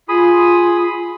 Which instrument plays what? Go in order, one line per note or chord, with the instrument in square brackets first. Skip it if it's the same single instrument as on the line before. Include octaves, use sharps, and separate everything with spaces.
[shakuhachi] F4 [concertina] G#4 B5 D#6